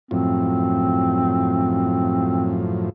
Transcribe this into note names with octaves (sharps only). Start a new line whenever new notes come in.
F#2 A2 F3 C4